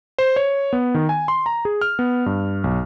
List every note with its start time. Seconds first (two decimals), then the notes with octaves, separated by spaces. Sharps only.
0.19 C5
0.36 C#5
0.73 B3
0.94 D#3
1.09 G#5
1.28 C6
1.46 A#5
1.65 G#4
1.81 F6
1.99 B3
2.26 G2
2.64 B1